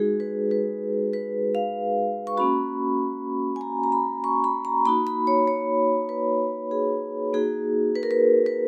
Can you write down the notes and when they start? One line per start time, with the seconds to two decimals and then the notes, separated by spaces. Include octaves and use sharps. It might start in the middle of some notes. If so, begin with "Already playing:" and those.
Already playing: G#3 D#4 F#4 G#4
0.20 B4
0.51 B4
1.13 B4
1.55 F5
2.27 C#6
2.37 A#3 C#4 F#4 B5
3.56 G#5
3.61 A#5
3.84 A#5
3.92 B5
4.24 C#6
4.44 B5
4.65 A#5
4.85 A#3 D#4 F#4 B5
5.07 B5
5.27 C#5
5.47 C#5
6.09 B4
6.71 G#4
7.33 A#3 D#4 F#4 G#4
7.96 B4
8.03 A#4
8.11 B4
8.46 B4